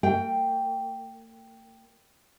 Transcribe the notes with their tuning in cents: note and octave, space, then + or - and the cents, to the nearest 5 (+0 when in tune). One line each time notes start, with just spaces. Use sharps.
A#3 -45 G5 +0